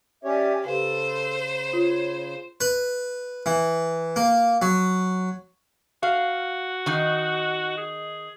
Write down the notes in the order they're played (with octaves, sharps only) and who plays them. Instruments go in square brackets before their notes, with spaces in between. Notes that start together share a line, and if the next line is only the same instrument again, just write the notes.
[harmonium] C#4 G4 C#5 [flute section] D5 E5 G#5
[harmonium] C#3 [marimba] G4 B4 F5 [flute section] A4 [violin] C5
[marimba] F4 [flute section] C#5
[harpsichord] B4
E3
A#3
F#3
[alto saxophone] F#4 [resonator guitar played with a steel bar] F5
[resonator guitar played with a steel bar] D#3 D#4
[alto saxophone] G#4